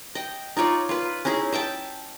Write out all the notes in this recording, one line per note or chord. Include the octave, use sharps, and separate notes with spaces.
D#5 G5
D#4 F4 C#5 D5
F4 B4
C#4 D#4 E4 G#4
D#5 E5 G5 A5